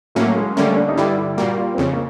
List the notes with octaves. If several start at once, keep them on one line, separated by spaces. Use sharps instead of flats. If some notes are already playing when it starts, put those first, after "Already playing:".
A2 F#3 A3 A#3 C#4
G#3
D3 G3 A3 A#3 C#4
D4
D#4
G2 D3 G3 E4
E4
A#2 G3 A#3 F#4
F4
C4
F2 C#3 C#4
A#3